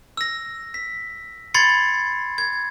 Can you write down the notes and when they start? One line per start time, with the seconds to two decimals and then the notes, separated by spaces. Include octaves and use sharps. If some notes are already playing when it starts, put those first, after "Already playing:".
0.17 E6 A#6
0.74 B6
1.54 B5 C6 G#6 A6 C7 C#7
2.38 G#6